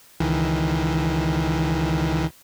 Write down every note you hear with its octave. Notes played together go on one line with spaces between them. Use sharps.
C#2 D#3 E3